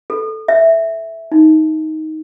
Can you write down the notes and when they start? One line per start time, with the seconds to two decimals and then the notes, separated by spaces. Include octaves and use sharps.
0.10 A4
0.48 E5
1.32 D#4